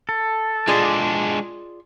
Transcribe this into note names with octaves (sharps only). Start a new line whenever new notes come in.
A4
G#3 D4 F4 G#4 D5